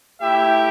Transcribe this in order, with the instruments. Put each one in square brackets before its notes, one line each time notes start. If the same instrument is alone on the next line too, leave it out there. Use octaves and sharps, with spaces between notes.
[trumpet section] A3 E4 G4 E5 G5